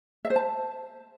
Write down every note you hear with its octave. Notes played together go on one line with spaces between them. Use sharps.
E5
C5
A5